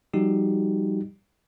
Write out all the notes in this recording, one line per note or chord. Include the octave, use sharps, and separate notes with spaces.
F3 G3 D#4 F#4 G4